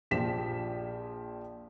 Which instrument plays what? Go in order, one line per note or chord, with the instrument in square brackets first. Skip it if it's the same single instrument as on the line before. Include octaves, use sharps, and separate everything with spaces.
[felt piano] A#1 F3 F4 G4 B6 E7